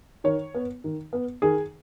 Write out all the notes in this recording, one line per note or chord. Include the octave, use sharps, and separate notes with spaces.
D#3 C#5
B3
D#3
B3
D#3 G#4